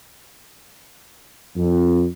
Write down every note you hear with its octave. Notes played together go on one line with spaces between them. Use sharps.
F2